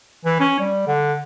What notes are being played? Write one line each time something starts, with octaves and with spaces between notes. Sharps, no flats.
E3
C#4
G3
D3